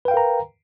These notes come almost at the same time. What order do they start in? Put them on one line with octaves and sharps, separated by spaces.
B4 G5 F5 A#4 A#5